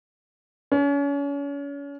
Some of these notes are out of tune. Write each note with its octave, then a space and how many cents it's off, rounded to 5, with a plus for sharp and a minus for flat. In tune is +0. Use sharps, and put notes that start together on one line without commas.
C#4 +35